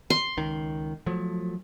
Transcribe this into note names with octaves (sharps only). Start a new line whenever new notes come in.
C6
C#2 D#3
F3 F#3 A3